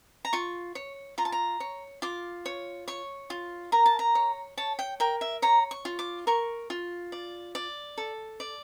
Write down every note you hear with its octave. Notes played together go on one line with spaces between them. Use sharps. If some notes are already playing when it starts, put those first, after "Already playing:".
A#5
F4 C#6
C#5
F4 A#5
A5
A#5
C#5
F4 D6
C#5
C#5 C#6
F4
A#4 A#5
A5
A#5
C#5
C#5 A5
G5
A#4 G5
E5
C#5 A#5
C#6
F4
D6
A#4 C#6
F4
D5
D5
A4
D5